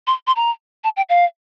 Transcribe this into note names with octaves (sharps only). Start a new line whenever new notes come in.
C6
C6
A#5
A5
G5
F5